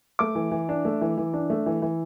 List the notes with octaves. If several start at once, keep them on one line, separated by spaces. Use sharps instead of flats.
A3 D6
E3
E3
D4
A3
E3
E3
D4
A3
E3
E3